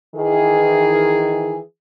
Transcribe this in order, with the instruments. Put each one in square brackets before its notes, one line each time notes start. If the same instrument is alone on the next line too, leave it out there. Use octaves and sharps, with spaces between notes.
[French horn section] D#3 E3 G#4